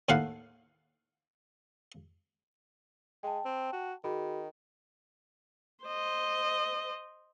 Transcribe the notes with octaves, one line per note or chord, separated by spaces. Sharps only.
D#2 A2 E4 F5 F#5
G#3 G5 A5
C4
F#4
D#3 F#4 G#4 B5
C5 D#5